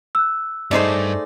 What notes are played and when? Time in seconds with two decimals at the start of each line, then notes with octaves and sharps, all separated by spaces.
0.15 E6 F#6
0.71 G2 A3 D#4 G#4 C5 D5